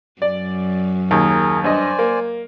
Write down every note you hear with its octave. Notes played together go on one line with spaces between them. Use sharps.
F#2 D5
D#2 G#4 A#4
G2 C5 D5 D#5 G#5
A#3